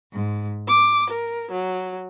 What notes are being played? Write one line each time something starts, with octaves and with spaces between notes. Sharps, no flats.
G#2
D6
A#4
F#3